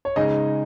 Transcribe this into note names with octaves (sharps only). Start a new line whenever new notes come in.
C#5
C#3 G#3 D#4 D#5